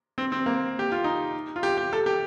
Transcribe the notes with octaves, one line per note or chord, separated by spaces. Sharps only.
C4
C4
A#3
G4
F4
D#4
F4
G4
G4
A4
G4